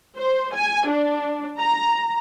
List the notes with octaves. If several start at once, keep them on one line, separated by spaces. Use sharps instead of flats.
C5
G#5
D4
A#5